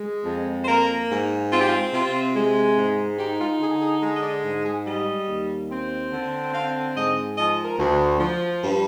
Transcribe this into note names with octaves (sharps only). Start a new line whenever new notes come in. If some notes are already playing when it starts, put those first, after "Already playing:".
Already playing: G#3
F2
C5
A#3 A#4
G#2
C4 F4
G4
F4
C3 F4
G#3
G#2
D#4 G4
F4
D3 G#4
G#4
G#3 G#4
D#5
D5
G#2
G#4
G3 D#5
D#2
C4
D3
C4 F5
G#2 D#5
F3 D#5
A#4
D2
F3
G2